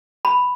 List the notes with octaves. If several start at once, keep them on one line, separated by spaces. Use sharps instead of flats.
B5